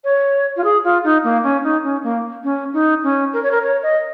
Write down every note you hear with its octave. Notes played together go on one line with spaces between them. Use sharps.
C#5
F4
G#4
F4
D#4
A#3
C#4
D#4
C#4
A#3
C#4
D#4
C#4
A#4
C#5
A#4
C#5
D#5